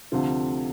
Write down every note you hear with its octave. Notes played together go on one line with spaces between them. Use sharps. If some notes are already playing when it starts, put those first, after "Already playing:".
D2 C3 F3 C4 F4